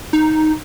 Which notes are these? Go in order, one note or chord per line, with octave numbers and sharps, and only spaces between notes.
D#4